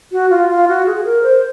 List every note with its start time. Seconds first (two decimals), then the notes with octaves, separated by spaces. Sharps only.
0.12 F#4
0.31 F4
0.49 F4
0.68 F#4
0.86 G#4
0.97 G#4
1.05 A#4
1.23 C5